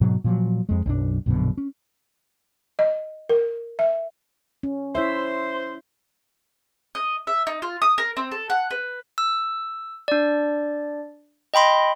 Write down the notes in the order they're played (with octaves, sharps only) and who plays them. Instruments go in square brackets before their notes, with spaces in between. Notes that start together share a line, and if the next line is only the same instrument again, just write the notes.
[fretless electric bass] G#2 B2 F#3
A#2 F3 F#3
F2 G#3
B1 F#2 D4
A#1 F#2 B2 D3
C#4
[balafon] D#5
A#4
E5
[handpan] C#4
[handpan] E4 C#5 E5 [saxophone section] C5
[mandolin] D#5
E5
D#4
F4
D#6
A#4
C4
A4
F#5
B4
[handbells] E6
D4 D5
D#5 G5 B5 C6